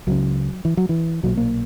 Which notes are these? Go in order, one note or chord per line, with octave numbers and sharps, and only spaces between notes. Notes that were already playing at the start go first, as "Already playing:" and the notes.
C#2 C#3 F#3
E3
F#3
E3
B1 A#2 F#3
A#3